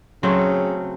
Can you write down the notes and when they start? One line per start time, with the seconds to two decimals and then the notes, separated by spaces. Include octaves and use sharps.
0.23 C#3 F#3 A3 C4